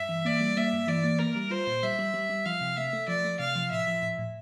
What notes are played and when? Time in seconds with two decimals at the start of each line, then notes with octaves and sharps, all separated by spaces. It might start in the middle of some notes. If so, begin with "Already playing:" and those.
Already playing: G2 E5
0.09 E3
0.25 A#3 D5
0.41 G3
0.57 A#3 E5
0.73 G2
0.87 E3 D5
1.04 A#3
1.19 A#3 A#4
1.36 G3
1.51 F4 C5
1.67 A#2
1.83 G3 E5
1.99 G3
2.14 G3
2.30 G3
2.45 F3 F5
2.61 C3
2.77 A3 E5
2.93 A3
3.08 F3 D5
3.24 A3
3.39 C3 F5
3.55 F3
3.71 A2 E5
3.87 F3
4.02 A2
4.18 A2